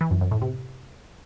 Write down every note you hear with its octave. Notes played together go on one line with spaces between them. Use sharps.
E3
F#2
F#2
A2
C3